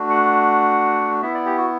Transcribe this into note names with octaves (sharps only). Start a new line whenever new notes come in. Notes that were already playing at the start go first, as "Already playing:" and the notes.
Already playing: A3 D4 F#4
F#5
B3 E4 E5
D5
G4
F#4